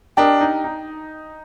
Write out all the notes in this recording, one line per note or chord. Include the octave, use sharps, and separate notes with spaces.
D4 G4 A#4 D#5
D#4
D#4